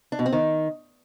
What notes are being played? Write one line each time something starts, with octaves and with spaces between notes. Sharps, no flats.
D4
B2
C4
D#3